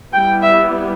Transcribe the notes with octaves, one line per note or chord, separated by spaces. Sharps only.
G3 B3 E4 G5
E5